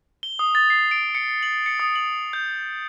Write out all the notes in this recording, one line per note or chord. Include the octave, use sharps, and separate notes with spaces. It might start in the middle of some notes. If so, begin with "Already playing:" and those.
G7
D#6
A6
C7
D7
C#7
F#7
C#7
D#6
F#7
G6